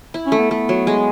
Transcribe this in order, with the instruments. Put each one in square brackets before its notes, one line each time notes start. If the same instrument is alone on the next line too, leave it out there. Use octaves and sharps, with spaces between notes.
[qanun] E4
[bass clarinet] C#4
[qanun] A3
[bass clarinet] B3
[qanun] A3 [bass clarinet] B3
[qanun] F#3
G#3